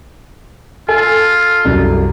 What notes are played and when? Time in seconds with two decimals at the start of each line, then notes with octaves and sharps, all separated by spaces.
0.89 F4 A4 G#5
1.65 C2 F#2